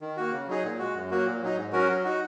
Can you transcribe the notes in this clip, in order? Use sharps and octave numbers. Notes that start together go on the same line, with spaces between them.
D#3
A#3 F#4
C#3
F#3 D#4 G#4
A#2
G#3 F#4
F#2
F#3 A#3 F#4
A#2
F#3 D#4
G#2
F#3 C#4 F#4 A#4
F#3
D#4 F#4